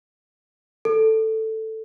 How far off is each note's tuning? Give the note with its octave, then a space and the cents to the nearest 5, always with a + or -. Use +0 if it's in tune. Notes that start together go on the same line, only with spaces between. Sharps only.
A4 +5